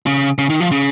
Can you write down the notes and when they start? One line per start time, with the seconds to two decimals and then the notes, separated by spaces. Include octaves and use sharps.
0.06 C#3
0.38 C#3
0.50 D#3
0.60 F3
0.71 C#3